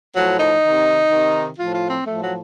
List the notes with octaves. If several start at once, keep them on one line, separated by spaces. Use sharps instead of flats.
A2 F3 F#3
D#4
C3 D#3
C3 D#3
A2 F3 F4
F4
C4
A2 F3 A3
F#3